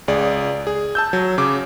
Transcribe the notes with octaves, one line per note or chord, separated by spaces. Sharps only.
C#2 G#4 D5
G#4
A5 E6 G6
F#3
C#3 D6